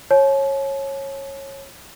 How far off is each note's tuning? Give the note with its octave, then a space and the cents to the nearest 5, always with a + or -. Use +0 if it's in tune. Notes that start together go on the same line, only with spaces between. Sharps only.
C#5 -20 A5 -45